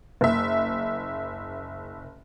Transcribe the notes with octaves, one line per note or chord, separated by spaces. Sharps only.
F#1 E5